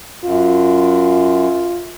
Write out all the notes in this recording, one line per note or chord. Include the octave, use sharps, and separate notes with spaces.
F#2 F4